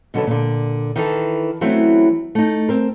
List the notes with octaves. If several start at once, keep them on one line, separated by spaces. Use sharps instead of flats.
B2 D3 F#3 C#4 A4 B4
A#2 D3
D#3 E3 A4
E3 F#3 A3 C4 C#4 E4
A3 D#4
C4 A#4